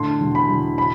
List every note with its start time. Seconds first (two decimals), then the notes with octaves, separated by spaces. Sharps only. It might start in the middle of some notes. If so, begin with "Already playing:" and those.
Already playing: A2 D3 C6
0.21 E1
0.35 B5
0.49 E1
0.78 B5